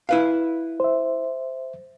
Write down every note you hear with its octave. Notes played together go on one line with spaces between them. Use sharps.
E4 B4 F5
C5 E5